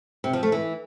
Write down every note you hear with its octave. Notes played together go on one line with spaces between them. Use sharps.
C3
F3
A3
E3